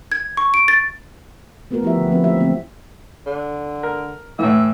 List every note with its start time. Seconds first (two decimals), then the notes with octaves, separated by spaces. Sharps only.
0.12 G#6
0.37 C#6
0.54 D7
0.68 A6
1.71 A3 B3 F4 F#4 A#4
1.83 F3 B3 E4 G4 E5
1.97 D3
2.08 F3 A#3 C4 B4
2.24 E3 F#3 A3 G4 E5
2.40 D3 F3 A3 A#3 C4
3.27 D3
3.83 A#4
4.39 A2 E3 E5